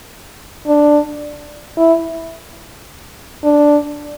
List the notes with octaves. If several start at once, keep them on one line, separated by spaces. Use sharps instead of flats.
D4
E4
D4